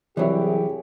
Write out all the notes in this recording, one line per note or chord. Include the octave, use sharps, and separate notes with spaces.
C2 E3 F#3 E4 G4 G#4 C#5 D5